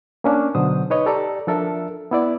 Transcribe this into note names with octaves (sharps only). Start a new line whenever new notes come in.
A#3 C#4 D4
B2 D3 F#3 C5 D#6
D#4 B4 C#5 D#5
G4 A4 D5 A#5
F3 D4 A4 A#4 E5
B3 E4 D5